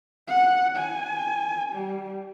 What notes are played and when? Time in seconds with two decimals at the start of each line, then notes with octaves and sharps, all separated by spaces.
0.28 F#5
0.77 G#5
1.72 G3